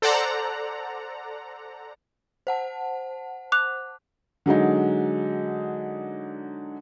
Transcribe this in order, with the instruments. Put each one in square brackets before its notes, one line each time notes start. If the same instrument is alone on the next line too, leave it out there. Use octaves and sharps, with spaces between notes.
[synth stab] A4 C5 D5 F#5 A#5
[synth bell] C5 F#5 A5
[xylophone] D6 F#6 F7
[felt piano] D3 F#3 G#3 D#4